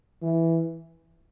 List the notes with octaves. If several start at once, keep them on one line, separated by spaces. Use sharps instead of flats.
E3